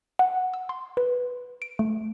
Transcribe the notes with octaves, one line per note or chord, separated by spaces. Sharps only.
F#5
E6
C6
B4
D7
A3